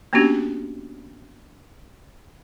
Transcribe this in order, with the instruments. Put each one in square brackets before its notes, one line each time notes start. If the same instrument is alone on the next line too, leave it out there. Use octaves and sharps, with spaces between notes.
[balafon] A#3 B3 C#4 D4 F#4 G4